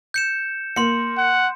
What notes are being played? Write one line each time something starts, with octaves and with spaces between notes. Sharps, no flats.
G6 C#7 E7
A#3 C6 C#7
F#5